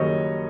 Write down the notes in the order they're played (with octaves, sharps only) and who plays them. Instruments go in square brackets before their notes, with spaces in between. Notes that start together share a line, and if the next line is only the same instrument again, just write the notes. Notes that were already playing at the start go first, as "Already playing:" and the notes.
Already playing: [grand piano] F#1 F#2 D#3 G3 C#5 D#5